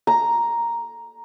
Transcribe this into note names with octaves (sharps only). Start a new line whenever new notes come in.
A#5